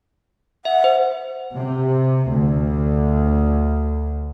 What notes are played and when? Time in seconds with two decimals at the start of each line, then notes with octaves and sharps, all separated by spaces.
0.65 E5 F#5
0.84 C5
1.56 C3
2.31 D2